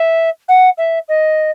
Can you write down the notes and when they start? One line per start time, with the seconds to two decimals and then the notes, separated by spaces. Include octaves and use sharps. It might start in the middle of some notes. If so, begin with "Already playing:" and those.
Already playing: E5
0.48 F#5
0.78 E5
1.09 D#5